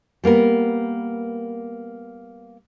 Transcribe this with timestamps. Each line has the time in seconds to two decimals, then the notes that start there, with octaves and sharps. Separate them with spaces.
0.24 G3 A#3 B3 A#4